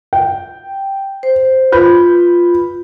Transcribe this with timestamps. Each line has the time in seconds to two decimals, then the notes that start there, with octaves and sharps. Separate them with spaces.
0.13 G5
1.23 C5
1.72 F4 B4 B5 G6